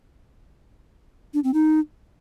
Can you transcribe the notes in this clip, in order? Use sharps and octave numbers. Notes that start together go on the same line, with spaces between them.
D4
C4
D#4